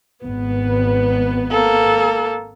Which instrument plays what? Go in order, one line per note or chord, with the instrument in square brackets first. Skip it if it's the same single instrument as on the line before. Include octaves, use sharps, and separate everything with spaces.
[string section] G#1 B3
[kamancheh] A#3 A4